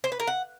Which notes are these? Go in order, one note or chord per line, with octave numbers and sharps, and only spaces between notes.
C5
B4
A#4
F#5